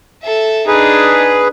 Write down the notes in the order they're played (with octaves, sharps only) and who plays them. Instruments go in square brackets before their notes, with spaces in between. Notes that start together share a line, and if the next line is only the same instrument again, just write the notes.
[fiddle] A4 E5
[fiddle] D4 D#4 [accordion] G#4 B4